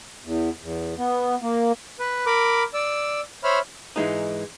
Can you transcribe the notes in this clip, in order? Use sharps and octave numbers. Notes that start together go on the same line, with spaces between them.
E2
E2
B3
A#3
B4
A#4 B5 D6
D5 E6
C5 C#5 E5 B5 F6
G#2 E3 G#3 D#4